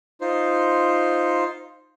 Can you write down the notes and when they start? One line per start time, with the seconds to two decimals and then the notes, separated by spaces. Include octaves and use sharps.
0.21 D#4 F4 C5